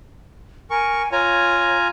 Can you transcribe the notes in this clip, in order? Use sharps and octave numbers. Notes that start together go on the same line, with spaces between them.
A#4 G#5 C#6
F4 C#5 G#5 A#5